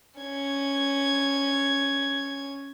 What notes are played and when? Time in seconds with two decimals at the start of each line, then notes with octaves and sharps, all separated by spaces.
0.20 C#4 G#6